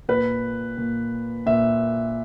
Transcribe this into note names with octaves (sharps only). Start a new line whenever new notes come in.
A#2 B4
A#2
A#2 E5